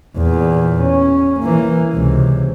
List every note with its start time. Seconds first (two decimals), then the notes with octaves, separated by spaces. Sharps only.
0.17 E2 A#2
0.81 C#4
1.40 E3 A#3
1.93 C#2 C3